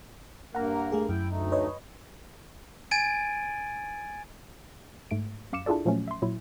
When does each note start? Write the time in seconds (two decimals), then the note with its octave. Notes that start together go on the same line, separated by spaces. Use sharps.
0.55 G2 A#3 A#4 F#5 A#5
0.92 A3 G#4
1.09 F#2 E4 G5
1.29 D2 A3 D#4
1.52 B4 C#5 D#5
2.91 G#5 G#6 A6 D7 D#7
5.11 G#2 A3 D7
5.53 F#2 F5 D6 C#7 E7
5.66 D4 E4 F4 G#4 A4 D5
5.85 A#2 F3 F#3 A3 C#4
6.08 E5 C6
6.22 A#2 F#3 E4